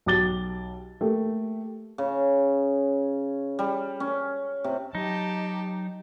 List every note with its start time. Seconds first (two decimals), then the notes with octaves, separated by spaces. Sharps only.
0.06 B1 G4 D6 A6 G7
1.01 A3 A#3 G4
1.98 C#3
3.59 G3
4.00 C#4
4.64 C3
4.95 F#3 D#4 G4 A5